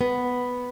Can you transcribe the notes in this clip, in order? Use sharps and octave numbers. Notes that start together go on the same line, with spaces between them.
B3